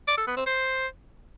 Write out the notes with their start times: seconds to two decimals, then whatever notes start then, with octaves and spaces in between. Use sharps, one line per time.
0.08 D5
0.18 A4
0.27 B3
0.37 C4
0.47 C5